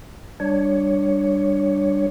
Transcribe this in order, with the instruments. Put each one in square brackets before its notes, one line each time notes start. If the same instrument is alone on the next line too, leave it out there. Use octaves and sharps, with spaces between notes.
[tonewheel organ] G3 D4 C#5